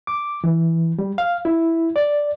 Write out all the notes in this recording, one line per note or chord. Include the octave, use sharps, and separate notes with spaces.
D6
E3
G3
F5
E4
D5